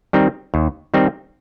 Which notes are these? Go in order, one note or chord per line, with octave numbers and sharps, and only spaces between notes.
D#3 G3 C4 D#4
D#2
D#3 G3 C4 D#4